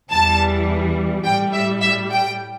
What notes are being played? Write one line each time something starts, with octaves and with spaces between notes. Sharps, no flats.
E2 E3 G3 A5
A2 G3 G5
E5
E5
G5